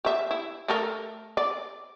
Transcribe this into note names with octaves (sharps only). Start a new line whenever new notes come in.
G4 E5
E4
A3 A4 A#4
D5